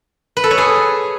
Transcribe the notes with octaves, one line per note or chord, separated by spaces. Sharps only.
B4
A4
C#5
G#4